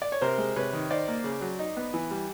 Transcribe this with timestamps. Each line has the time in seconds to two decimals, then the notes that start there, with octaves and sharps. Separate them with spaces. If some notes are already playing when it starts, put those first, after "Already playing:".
0.02 D5
0.12 C#5
0.21 C3 A#4 C5
0.38 G#3
0.56 C3 B4 C#5
0.73 D#3
0.90 D#4 C5 D5
1.08 A#3
1.24 C#3
1.41 F#3
1.59 D#4
1.77 B3
1.94 E3
2.11 G3